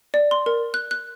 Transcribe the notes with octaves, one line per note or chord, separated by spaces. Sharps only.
D5
C6
A#4
F#6
F#6